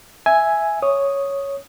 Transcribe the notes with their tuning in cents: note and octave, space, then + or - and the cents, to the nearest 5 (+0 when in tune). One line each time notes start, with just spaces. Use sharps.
E5 +0 G#5 +0
C#5 +0 D#6 +0